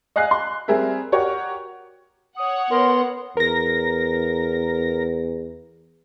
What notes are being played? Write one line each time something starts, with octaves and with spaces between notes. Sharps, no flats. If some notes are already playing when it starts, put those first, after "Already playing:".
D#5 F5 G#5 F#6 C7
C6
G3 C4 G#4 A#4 E5
F#4 G4 A#4 C#5
C#5 F#5 D#6
B3 A#4 C6
E2 A#4 A#6